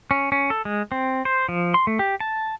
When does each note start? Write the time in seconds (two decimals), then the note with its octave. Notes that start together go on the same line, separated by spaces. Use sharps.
0.11 C#4
0.32 C#4
0.50 A4
0.65 G#3
0.92 C4
1.25 C5
1.49 F3
1.74 C6
1.87 A3
1.99 G4
2.20 A5